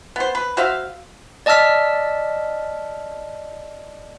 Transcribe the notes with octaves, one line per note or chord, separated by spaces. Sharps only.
B3 C5
B4
F#4 C5 E5 F5
D5 D#5 A5 E6 F6 B6